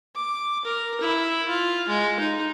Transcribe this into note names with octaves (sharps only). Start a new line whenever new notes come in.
D6
A#4
E4
F4
G#3
D#4